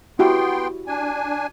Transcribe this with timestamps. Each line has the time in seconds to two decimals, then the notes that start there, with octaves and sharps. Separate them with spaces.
0.19 B3 E4 F#4 G4 G5 C6
0.87 D4 G#5